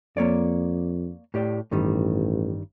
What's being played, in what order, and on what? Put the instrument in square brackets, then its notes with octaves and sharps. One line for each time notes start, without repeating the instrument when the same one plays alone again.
[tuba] F2 [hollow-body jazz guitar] A#3 C#5 D5
[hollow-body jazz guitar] A2 G4 D5
[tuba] A1 [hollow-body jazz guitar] G2 D#3 G3